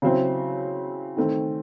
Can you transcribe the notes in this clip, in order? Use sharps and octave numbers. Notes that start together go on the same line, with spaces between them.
C#3 F#3 C4 E4 C5
D#3 A3 C4